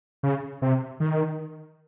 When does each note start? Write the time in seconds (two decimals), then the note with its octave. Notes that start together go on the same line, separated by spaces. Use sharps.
0.23 C#3
0.62 C3
1.00 D#3